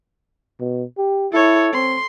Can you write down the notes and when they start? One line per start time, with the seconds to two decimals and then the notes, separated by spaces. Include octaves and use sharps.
0.60 B2
0.98 G4
1.32 E4 A4 C#5
1.73 C4 C6